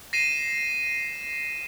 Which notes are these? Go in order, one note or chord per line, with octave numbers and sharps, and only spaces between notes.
A#6 C7 D#7 E7